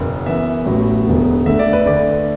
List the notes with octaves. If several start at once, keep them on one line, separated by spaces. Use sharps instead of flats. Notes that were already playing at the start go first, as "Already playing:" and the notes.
Already playing: F#1 E2 B2 B3
F#2 E3 B3 E5
A1 A2 F#3 B3
E1 E2 D3 B3
D2 D3 A3 E5
D5
B4
D2 D3 A3 D5